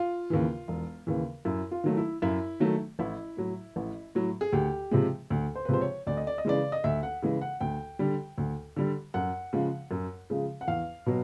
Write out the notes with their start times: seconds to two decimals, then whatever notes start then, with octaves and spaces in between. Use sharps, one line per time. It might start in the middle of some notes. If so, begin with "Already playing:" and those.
Already playing: F4
0.30 D#2 C#3 E3
0.68 E1
1.07 D#2 C#3 E3
1.45 F#2 E4
1.71 F4
1.84 D#3 F#3 A3
1.97 E4
2.22 F#2 E4
2.60 D#3 F#3 A3
2.99 A1 E4
3.37 A2 F#3
3.76 A1
4.15 A2 F#3
4.41 G#4
4.52 D2 G4
4.91 C3 F3 G#3
5.30 D2
5.55 C5
5.65 B4
5.69 C3 F3 G#3 C5
5.81 C#5
6.07 D2 D5
6.17 D#5
6.27 D5
6.38 D#5
6.45 C#3 E3 G#3 D5
6.72 D#5
6.84 D2 E5
7.03 F#5
7.22 C#3 E3 G#3
7.41 F#5
7.61 D2 G5
7.99 D3 G3
8.38 D2
8.76 D3 G3
9.14 F#2 F#5
9.53 C#3 F3 G#3
9.91 F#2
10.30 C#3 F3 G#3
10.61 F#5
10.68 E2 F5
11.06 B2 F#3